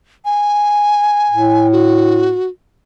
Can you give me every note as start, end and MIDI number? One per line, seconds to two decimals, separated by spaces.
0.25 1.67 80
1.31 2.36 45
1.72 2.48 66